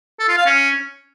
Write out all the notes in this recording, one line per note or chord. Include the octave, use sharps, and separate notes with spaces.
A4
F4
F5
C#4